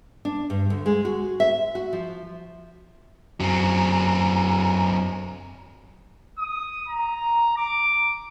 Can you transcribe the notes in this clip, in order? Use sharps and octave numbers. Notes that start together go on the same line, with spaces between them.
D4
G2
D2
G#3
F#4
E5
F#4
F3
F#2 F#3 C4 G#5 A#5
D#6
A#5
D6